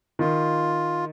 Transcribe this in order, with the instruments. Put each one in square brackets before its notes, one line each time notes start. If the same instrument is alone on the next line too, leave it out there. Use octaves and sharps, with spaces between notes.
[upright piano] D#3 [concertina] F4